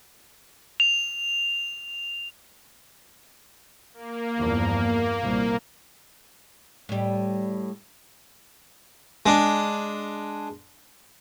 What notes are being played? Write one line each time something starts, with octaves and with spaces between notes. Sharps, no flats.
F7
A#3
E2 G2 F3
C2 A#2
A2 G3
G#3 D4